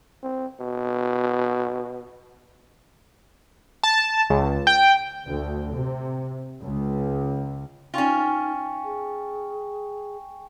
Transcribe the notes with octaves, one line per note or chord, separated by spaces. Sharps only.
C4
B2
A5
C#2
G5
D2
C3
C#2
C#4 D#4 F4 G5 G#5 C#6
G#4